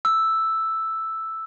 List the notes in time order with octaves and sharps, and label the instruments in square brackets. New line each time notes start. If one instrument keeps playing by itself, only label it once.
[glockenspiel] E6